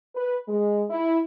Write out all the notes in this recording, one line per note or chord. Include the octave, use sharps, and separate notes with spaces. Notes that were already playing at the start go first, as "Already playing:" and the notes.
B4
G#3
E4